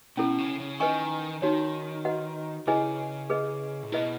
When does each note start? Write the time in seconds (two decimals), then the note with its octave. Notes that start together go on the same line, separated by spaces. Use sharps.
0.17 B2 C#4 E4 A4
0.38 C#3
0.60 C#3
0.80 D#3 B4 D#5 G#5 C#6
1.42 D#3 D#4 F#4 C#5
2.05 F#4 B4 D#5 F#5
2.67 C#3 E4 G#4 B4 D#5 G#5
3.30 G#4 B4 D#5
3.83 A2
3.92 B2 E4 B4 D#5